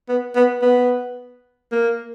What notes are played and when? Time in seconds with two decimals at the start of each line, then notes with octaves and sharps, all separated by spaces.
0.09 B3
0.36 B3
0.62 B3
1.72 A#3